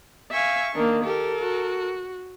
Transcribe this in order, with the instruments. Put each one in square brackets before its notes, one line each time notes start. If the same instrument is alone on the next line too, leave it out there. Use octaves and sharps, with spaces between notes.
[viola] E5 G#5 [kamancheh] F5 C#6
[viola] D#3 A#3 [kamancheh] D4
[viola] G4 [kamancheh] A4 A#4
[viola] F#4